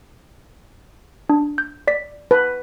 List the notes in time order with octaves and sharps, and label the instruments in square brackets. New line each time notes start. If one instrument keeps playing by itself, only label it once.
[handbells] D4
G6
D5 B6
[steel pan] B4